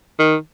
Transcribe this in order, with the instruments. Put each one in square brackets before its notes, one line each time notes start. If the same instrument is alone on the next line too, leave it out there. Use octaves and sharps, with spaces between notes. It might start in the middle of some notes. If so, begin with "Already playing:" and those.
[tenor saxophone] D#3